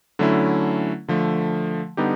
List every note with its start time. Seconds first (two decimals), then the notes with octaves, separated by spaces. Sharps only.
0.19 D3 F#3 A3 C#4 E4
1.08 D3 F3 A3
1.97 D3 G3 B3 D#4 G4